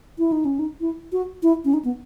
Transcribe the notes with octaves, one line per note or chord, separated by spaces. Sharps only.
E4
D#4
C#4
D#4
E4
F#4
E4
C#4
D#4
B3